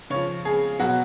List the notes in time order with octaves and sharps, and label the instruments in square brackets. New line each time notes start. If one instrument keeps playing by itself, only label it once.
[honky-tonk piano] C#3 F3 C#5
G#4
B2 F#3 F#4